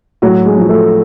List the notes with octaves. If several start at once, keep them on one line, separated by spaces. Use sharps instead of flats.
A2 F#3 F#4
G#3 G#4
F3 G#3
A3 A4